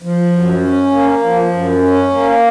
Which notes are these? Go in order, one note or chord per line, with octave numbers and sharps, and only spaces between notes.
F3
F#2
C#4
A#3
F3
F#2
C#4
A#3